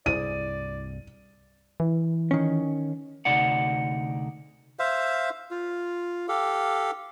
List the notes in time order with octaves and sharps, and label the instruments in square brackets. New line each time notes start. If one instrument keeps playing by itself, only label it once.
[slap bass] C2 G2 [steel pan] E4 G#4 C5 [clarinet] D5 [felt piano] D#7
[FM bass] E3
[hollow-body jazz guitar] D#3 C#4
[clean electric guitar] D2 C3 D#4 D5 F#5
[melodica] C5 E5 F5
F4
G4 A4 F5